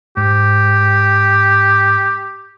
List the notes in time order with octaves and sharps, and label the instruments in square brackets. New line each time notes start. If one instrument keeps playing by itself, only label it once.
[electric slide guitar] G#2 [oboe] G4